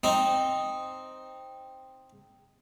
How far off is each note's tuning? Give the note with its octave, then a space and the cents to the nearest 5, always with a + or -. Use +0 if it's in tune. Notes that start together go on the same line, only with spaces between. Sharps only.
C4 +0 D#4 +0